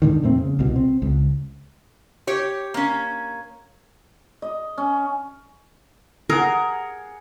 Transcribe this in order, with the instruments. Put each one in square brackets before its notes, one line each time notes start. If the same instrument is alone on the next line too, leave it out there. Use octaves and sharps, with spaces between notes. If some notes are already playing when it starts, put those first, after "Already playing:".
[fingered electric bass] G#2 D3 D#3
F2 A#2 A3 C4
C#3
C2 B2
C4
C#2
[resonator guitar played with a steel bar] G4 C#5
A#3 C#4
[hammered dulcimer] D#5
C#4
[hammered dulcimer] G#4 F#5 [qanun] A#4